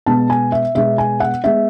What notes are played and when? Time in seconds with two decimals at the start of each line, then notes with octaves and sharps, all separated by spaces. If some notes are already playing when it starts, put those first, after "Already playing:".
0.06 B2 G#3 B3 A5
0.30 G#5
0.52 E5
0.75 B2 G#3 B3 E5
0.98 G#5
1.20 F#5
1.44 G#3 B3 E5